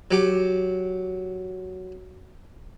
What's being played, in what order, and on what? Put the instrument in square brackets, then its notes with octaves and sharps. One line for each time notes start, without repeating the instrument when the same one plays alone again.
[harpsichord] F#3 G4